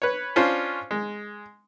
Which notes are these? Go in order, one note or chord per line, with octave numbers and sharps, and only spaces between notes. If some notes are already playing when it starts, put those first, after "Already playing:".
B4 C#5
C#4 D4 F4 C5
G#3